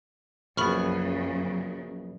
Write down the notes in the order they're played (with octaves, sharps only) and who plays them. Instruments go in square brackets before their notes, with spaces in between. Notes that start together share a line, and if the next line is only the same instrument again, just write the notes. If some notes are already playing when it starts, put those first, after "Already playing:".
[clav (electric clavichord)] A#1 B3 [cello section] F#2 C#3 F#3 [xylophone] B5 C#6 F6